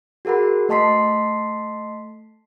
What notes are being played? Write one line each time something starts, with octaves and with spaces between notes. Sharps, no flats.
F#4 G#4 A#4 F#5 B5
A3 D#5 A5 C6 B6 C7